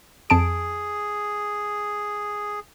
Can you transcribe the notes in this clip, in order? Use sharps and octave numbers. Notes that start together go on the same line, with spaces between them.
F2 G#4 A5 D7